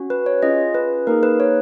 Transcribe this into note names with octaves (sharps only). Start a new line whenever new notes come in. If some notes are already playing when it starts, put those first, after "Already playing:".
Already playing: C#4 F#4
B4
C#5
C#4 F4 G#4 D#5
B4
A#3 D#4 G#4 A#4
B4
C#5